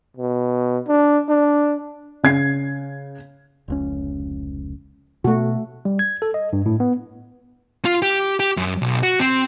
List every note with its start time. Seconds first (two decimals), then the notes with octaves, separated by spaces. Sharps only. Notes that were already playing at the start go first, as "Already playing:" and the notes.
0.17 B2
0.88 D4
1.29 D4
2.23 C#3 G#6 C7
3.68 F1 C#2 C#4
5.24 B2 A3 F#4
5.85 G3
5.99 G#6
6.22 A4
6.34 D#5
6.53 G2
6.66 A2
6.80 B3
7.85 F4
8.02 G4
8.40 G4
8.57 F#2
8.82 B1
9.03 F#4
9.20 C4